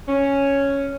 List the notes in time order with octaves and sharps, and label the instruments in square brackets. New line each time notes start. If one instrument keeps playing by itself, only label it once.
[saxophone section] C#4